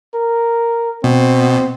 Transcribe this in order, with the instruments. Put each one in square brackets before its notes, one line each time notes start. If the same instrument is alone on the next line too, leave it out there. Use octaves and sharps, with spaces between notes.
[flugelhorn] A#4
[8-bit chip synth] B2 [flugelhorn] C4